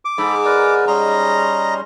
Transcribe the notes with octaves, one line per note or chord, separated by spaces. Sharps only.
D6
G#2 A4 B5
A#4 B4 D5
G3 C#4 D#5 A#5 C6